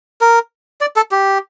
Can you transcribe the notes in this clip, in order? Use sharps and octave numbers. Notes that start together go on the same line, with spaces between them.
A#4
D5
A4
G4